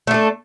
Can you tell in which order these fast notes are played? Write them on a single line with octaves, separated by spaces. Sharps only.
A3 D4 A4